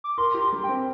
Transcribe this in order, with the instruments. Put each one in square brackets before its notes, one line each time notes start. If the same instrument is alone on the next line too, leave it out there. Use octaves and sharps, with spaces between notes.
[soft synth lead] D6
[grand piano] A#4 [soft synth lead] C6
[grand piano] G4
[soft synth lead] C6
[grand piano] G3
[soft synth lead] G5
[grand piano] C4